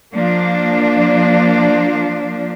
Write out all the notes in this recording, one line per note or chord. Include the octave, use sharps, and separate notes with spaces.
F3 A#3 D4